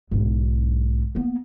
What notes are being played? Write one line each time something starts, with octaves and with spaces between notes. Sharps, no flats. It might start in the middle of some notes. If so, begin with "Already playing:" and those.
B1 G#2
A#3 B3